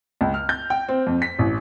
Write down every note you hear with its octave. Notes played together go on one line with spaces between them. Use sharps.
C#2
F6
G6
G5
C4
F2
B6
A1